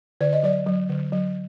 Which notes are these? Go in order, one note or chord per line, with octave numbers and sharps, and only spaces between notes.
D3 D5
D#5
F#3 D5
F#3
D3
F#3